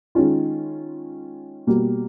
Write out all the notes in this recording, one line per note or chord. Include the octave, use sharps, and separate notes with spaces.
D#3 G#3 C#4 F4
B2 G3 A#3